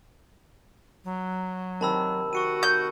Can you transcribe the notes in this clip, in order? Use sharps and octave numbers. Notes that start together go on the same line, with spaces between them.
F#3
C3 D#3 A5 B5 E6
F#4 C#6 C#7 D#7
G6